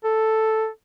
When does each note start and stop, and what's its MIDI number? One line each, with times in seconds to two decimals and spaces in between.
0.04 0.68 69